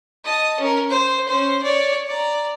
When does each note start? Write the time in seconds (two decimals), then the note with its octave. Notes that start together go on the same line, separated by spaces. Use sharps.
0.24 D#5 A5
0.60 C#4 A#4
0.90 C5
1.28 C#4 C5
1.63 C#5 D5
2.07 D5 A#5